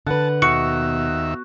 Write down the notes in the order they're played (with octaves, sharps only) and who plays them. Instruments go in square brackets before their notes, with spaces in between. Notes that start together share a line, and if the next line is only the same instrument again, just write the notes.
[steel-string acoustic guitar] D3 B4 [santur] F#5 [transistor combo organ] A5
[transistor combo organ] D#2 E5 [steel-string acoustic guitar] B2 [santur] F#4 [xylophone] C#6 C#7